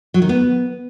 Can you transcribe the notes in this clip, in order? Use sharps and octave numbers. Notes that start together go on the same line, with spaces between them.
F#3
D#3
B3